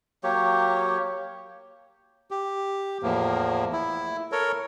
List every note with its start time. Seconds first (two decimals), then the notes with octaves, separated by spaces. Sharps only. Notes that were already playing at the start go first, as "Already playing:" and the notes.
0.23 F#3 A#3 G4 C#5
2.31 G4
3.03 E2 A2 F3 A#3
3.73 E4
4.32 A4 A#4 C#5